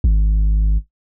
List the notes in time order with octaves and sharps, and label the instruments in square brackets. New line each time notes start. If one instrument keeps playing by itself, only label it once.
[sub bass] G#1